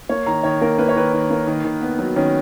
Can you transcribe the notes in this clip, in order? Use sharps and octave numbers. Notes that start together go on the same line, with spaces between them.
A#3 C#5
D#3 A#5
D#3 C#5
A#3 A#4
A#3 B4
C#5
D#3 B4
D#3
A#3
D#3
D#3
B3
F#3
D#3 C#4